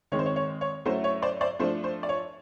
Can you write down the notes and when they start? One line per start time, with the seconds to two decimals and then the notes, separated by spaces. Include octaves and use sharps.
0.12 D#3 G#3 C4 C#5
0.19 C5
0.26 C#5
0.36 C#5
0.61 C#5
0.85 F#3 A3 C#4 E4 C5
1.04 C#5
1.22 C5 D5
1.41 C5 D5
1.59 F3 A3 D4 C5
1.84 C5
2.03 D5
2.09 C#5